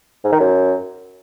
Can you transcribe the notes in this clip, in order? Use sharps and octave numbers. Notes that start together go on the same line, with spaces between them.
G#2
D#3
F#2